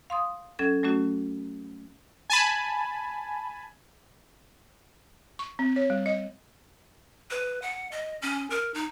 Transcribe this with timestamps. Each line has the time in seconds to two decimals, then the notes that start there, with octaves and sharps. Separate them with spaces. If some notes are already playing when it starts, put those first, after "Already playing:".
0.10 F5 C6 D#6
0.59 F#3 C#4 A4 G#6
0.83 F#3 A3 C#4 F#4
2.30 G#5 A5 B5
5.39 C#6
5.59 C4
5.76 C#5
5.90 G3
6.06 D#5
7.31 B4
7.62 F#5
7.92 D#5
8.22 C#4
8.50 A#4
8.74 D#4